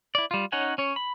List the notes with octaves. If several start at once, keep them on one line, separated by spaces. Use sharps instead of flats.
E4 D5
G3 F4
C#4 D#4 C#5 F#5 G#5
C#4 C#5
B5